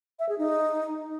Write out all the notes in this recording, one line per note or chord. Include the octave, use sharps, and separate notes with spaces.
E5
G#4
D#4